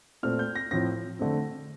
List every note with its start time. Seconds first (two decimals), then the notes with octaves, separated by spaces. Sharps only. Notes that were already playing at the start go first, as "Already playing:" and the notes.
0.23 A#2 A3 C4 F6
0.39 G6
0.55 A#6
0.71 A2 F3 C4 A#6
1.19 D3 A3 C4